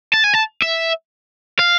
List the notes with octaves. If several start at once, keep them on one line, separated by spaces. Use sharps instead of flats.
A5
G#5
A5
E5
F5